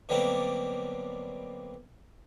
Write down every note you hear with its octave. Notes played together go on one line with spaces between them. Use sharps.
B2 D3 F#3 G3 A#3 C4